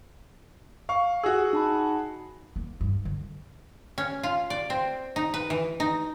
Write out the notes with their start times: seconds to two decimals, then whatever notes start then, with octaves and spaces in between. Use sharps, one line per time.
0.89 F5 C#6
1.24 F#4 G#4 E6
1.53 D#4 A5 B5
2.56 A#3
2.81 G2
3.05 D3
3.98 C#4
4.23 F4
4.50 D5
4.70 C4
5.16 D#4
5.34 B4
5.50 E3
5.80 D#4